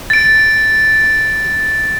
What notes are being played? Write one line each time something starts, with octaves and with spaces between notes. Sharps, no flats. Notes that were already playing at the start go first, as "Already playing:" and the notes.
A6 D7